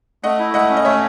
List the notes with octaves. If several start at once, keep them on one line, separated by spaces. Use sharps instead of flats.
A3 D#5 F#5
E4
A3 D#5 F#5
C#4
D#5
A3 C#5 E5